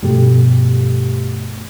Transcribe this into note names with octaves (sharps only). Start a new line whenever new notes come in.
G2 B2 F3 A3 G4